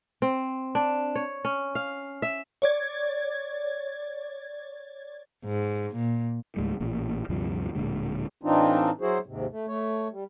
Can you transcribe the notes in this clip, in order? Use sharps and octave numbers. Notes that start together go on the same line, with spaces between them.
C4
D4
C#5
C#4
F5
E5
C#5 D5 G#6
G#2
A#2
C#2 G#2 G3 A3
A1 A#2
D2 G2 C3 F3
D1 A#2 D3 G#3
A2 E3 C4 D4 D#4 F4
F#3 E4 F#4 G#4 C5
D#2 G#2 C3
A3
A3 C#5
G3